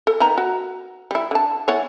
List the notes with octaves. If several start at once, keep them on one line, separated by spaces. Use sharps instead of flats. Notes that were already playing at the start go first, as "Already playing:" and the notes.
A4
D#3 B3 A#5
F#4
G3 E4
D3 A5
E3 B3 C#5